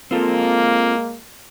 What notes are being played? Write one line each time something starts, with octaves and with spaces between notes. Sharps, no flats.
G#3 A#3 C4 F4 A4